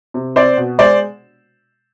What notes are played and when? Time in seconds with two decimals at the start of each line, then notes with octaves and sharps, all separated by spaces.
0.14 C3
0.36 C4 C5 D5
0.57 B2
0.78 G#3 C5 D5